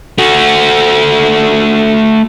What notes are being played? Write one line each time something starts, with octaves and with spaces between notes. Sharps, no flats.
A3 F#4